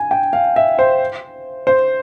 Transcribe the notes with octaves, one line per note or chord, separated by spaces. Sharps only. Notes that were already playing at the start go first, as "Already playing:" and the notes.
Already playing: G#5
G5
F5
E5
C5
C5